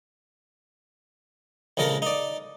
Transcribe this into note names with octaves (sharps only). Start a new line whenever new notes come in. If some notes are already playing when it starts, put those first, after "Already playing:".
A#1 C#3 G#3 A4 A#4
D#4 D5